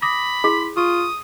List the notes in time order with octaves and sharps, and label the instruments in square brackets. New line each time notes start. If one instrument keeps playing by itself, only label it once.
[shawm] B5 [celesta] D6 D#6 A#6
[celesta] E4 C6 B6 [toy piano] G#4
[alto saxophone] F4 [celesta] C#6 [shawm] D#6